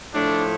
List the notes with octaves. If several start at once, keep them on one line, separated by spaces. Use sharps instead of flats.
A2 F3 A3 D4